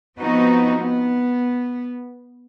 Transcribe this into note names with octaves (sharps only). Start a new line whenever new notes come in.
F3 B3 C4 D#4 F#4
B3